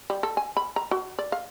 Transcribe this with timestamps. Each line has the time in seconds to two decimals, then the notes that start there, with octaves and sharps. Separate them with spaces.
0.10 G3
0.23 A4
0.37 G#5
0.57 B5
0.76 A#5
0.91 F#4
1.19 D5
1.32 F5